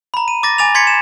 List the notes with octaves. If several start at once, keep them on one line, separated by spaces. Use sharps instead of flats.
A#5 B5
D#7
D6 A6 A#6
G#5 D6 A6 F7
C6 G#6 B6 C#7
E7